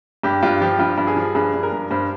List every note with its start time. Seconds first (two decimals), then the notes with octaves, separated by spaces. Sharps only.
0.23 G2 G4
0.42 G2 F4
0.61 F3 G4
0.79 G2 F4
0.98 G2
1.07 G#4
1.17 F3
1.35 G2 G#4
1.54 G2
1.63 A#4
1.72 G2
1.91 G2 C5